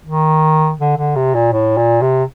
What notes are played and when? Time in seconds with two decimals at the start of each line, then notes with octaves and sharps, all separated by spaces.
0.06 D#3
0.80 D3
0.97 D3
1.16 C3
1.34 A#2
1.53 A2
1.77 A#2
2.02 C3